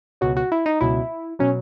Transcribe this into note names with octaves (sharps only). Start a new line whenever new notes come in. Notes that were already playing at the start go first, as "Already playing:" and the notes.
C#2 B2 F#3 F#4
F#4
E4
D#4
C#2 B2 F#3 E4
B2 F#3 C#4